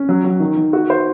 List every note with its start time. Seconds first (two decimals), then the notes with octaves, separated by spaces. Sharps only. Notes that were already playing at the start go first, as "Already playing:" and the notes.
Already playing: C#4
0.09 F#3
0.24 F#3
0.40 D#3
0.57 D#3
0.73 F#4
0.90 C5